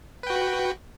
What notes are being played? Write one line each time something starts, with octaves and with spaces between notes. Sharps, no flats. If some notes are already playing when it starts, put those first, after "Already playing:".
F#4 B4 G5